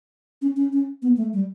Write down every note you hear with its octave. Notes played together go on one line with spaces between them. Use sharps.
C#4
C#4
C#4
B3
A3
G3